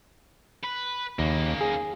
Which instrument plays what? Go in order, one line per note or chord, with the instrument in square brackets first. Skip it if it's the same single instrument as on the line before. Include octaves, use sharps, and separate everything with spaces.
[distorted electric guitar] B4
[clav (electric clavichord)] D#2 [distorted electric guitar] C#3 A#3
[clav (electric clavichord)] G#4